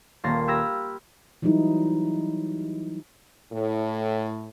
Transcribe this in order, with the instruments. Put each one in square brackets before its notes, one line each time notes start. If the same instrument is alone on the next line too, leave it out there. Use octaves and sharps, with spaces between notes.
[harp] D#1 A#3 A4 C6 A6 A#6
G4 B5 E6 F6 G#6 A#6
[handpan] E3 F#3 G3 D#4 E4
[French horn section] A2